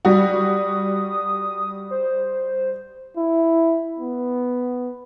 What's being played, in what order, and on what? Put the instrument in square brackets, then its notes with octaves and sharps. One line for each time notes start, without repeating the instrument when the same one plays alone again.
[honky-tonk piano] G3 F#4 [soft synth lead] D#6
[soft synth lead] C5
[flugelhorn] E4
B3